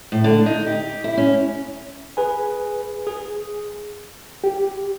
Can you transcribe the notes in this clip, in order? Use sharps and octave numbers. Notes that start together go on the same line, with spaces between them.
A2
D3
D#4
G4
E4
C#4
G#4 B4 G#5
G#4
G4